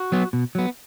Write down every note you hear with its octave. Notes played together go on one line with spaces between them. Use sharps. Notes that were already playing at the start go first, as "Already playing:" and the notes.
Already playing: F#4
F#3 B3
B2
F#3 B3